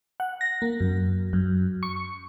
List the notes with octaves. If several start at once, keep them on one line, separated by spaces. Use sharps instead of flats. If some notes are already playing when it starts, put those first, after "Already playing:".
F#5
A#6
A#3
F#2
F#2
C#6